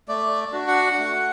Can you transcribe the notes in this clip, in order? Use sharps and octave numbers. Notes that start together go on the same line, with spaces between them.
A3 D5
D4 F#4
F#5
A3